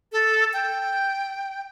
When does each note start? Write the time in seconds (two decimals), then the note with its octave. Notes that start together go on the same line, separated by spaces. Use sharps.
0.12 A4
0.53 G5